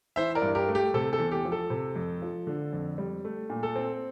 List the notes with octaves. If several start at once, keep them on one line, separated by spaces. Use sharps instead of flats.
E3 C5 E5
A#4 D5
G2
G4 A#4
A3
G4
C3 A4
A4
E2
G4
F3
A4
C3
F2
F3
D3
F2
G3
A3
A#2
A4
C4